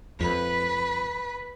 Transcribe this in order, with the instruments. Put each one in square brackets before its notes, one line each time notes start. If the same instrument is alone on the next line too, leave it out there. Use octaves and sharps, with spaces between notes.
[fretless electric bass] F2 [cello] B4